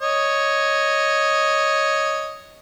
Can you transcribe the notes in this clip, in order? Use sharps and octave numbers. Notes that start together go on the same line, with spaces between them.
C#5 D#5